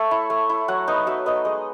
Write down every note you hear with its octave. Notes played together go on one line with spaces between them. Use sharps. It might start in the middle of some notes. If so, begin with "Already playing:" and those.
Already playing: A3 C#5 E5
E4
A3
E4
F#3 F#5
B3 D#4
F#3 E5
B3 D#4 D#5
G#3 D#5